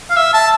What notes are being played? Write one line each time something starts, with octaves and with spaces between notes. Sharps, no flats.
F5
E5
A5